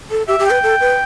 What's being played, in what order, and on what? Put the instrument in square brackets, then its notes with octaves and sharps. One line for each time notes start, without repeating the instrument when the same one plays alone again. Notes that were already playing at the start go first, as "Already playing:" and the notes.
[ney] A4
[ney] G4 [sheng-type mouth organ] E5
[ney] G4
[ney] B4 [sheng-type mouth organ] G5
[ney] A4
B4